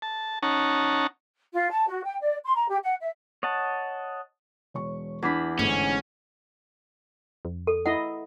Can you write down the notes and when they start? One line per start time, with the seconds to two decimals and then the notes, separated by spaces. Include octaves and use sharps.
0.02 A5
0.43 C#4 D#4 C#5 F#5 A5 A#5
1.55 F4
1.71 A5
1.88 F#4
2.06 G5
2.21 D5
2.44 C6
2.56 A#5
2.69 G4
2.83 F#5
3.01 E5
3.43 C#5 D#5 F#5 A5
4.74 E1 C#5 C#6
5.22 E2 D4 E4 B5
5.59 G1 G#2 A3 C#4
7.45 F2
7.67 A4
7.86 E4 D#5 F#5